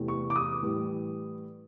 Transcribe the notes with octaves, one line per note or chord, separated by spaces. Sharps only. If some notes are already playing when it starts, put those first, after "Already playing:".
Already playing: E2 C3 E3 A3
C#6
D6
D#6
A2 E3 G3